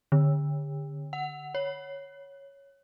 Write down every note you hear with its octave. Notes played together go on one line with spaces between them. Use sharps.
D3
F#5
C#5